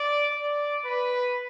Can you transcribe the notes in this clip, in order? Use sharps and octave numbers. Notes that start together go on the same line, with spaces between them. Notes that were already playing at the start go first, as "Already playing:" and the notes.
Already playing: D5
D5
B4